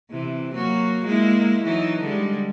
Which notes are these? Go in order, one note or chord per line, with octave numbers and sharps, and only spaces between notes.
C3 E3
F#3 A#3 F#4
G#3 A#3 E4
E3 F#3 D#4
D3 G3 G#3